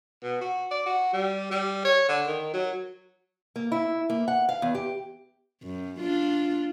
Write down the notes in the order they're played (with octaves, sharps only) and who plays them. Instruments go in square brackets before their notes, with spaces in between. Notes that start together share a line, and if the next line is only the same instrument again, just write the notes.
[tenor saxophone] B2
F#4
D5
F#4
G3
G3
C#5
D3
D#3
F#3
[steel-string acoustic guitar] A#3
E4
A#3
F#5
F5
E2
G4
[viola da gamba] F#2
D4 F4